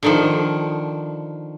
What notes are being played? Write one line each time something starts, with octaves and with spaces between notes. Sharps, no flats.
D3 D#3 F3